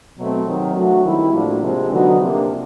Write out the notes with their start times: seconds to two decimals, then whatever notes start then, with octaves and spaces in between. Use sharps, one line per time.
0.17 B2 F#3 A3 C4
0.46 C3 D#3 F#3
0.76 F#3 A3 D4 F#4
1.04 D#3 G3 C4 E4
1.33 A2 F3 A#3 D4 F#4
1.62 C3 F3 G#3 C4
1.91 D3 F#3 B3 D#4 F#4
2.20 C3 F3 A#3 D4